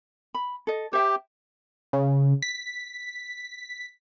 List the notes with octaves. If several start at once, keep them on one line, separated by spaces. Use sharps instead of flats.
B5
A4 D#5
G4 C5 E5 G5
C#3
B6